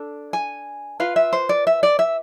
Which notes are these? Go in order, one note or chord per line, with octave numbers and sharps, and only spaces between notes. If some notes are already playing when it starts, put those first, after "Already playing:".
Already playing: D4 A4
G#5
F4 B4 F5
E5
C5
D5
E5
D5
E5